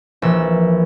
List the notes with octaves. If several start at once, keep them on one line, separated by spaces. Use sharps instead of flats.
A#1 E3 E6